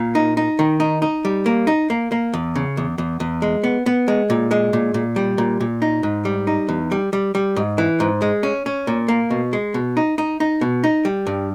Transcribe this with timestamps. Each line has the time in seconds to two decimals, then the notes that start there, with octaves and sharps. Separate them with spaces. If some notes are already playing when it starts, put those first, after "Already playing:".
Already playing: A#2 A#3
0.15 D#4
0.37 D#4
0.59 D#3
0.80 D#4
1.02 D#4
1.25 G3
1.46 A#3
1.67 D#4
1.90 A#3
2.12 A#3
2.33 E2
2.55 C#3
2.77 E2
2.98 E2
3.20 E2
3.42 G#3
3.64 B3
3.86 B3
4.08 G#3
4.30 A#2
4.51 G#3
4.73 A#2
4.94 A#2
5.16 G3
5.38 A#2
5.60 A#2
5.82 D#4
6.03 G#2
6.25 G3
6.47 D#4
6.69 E2
6.92 G3
7.13 G3
7.35 G3
7.56 G#2
7.78 E3
8.00 G#2
8.22 G#3
8.43 C#4
8.66 C#4
8.87 A#2
9.08 A#3
9.30 B2
9.53 G#3
9.74 B2
9.97 D#4
10.18 D#4
10.40 D#4
10.61 B2
10.84 D#4
11.05 G3
11.27 G2